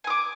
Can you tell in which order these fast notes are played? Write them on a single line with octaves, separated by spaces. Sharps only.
G#5 D#6 D6